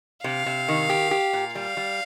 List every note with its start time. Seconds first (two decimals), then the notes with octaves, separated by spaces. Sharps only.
0.24 C3 F5
0.46 C3
0.68 D#3
0.90 G4
1.11 G4
1.33 A#2
1.55 G3 F5
1.77 G3